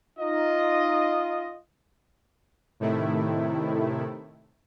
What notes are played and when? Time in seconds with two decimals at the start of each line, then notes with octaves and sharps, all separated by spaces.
0.20 D#4 F4 D#5
2.80 A2 C3 D#3 A3 E4